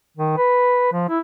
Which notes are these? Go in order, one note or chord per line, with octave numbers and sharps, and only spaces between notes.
D#3
B4
F3
E4